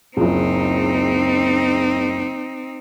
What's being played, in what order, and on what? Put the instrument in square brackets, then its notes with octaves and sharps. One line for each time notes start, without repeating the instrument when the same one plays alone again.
[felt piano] F#1 C#2 [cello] C4 D#4